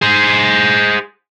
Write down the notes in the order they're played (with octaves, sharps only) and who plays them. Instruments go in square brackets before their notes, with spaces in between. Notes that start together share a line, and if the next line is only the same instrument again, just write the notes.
[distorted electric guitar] G#4 C5